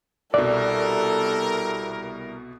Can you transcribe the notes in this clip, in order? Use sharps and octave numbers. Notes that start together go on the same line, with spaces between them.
C2 B2 G3 E4 A4 A#4 D5